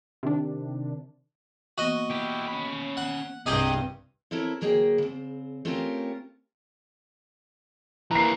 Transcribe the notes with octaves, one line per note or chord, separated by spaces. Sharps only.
C3 D#3 D4
E3 A#3 B3 F#4 D#5
E4 G4
C#4 B5
F#5
C2 G2 C3 G4 G#4 D#5
C4 E4 A4 A#4 C#5
D2 F#3 A#3 G#4 C#5 G5
C#3 C4
A3 C4 C#4 F4 G4 A#4
E3 A#3 A#5 C7